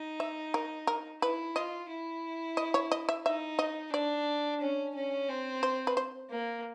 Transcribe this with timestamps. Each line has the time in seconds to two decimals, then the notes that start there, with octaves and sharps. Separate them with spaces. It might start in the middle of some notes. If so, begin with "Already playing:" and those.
Already playing: D#4
0.20 E5
0.54 A#4
0.87 A#4
1.22 E4 B4
1.56 F4 D#5
1.89 E4
2.57 D#5
2.74 C#5
2.92 D#5
3.09 E5
3.26 D#4 E5
3.59 D#5
3.93 D4 D5
4.61 C#4
4.95 C#4
5.29 C4
5.63 C5
5.87 B4
5.97 C5
6.30 A#3